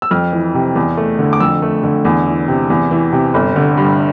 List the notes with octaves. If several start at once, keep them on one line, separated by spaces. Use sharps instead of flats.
E6
F2 F6
E3
C3
E2
A3
D3
D6
F2 E6
A3
D3
E2
E3
C3
E2
E3
C3
G1
D3
G2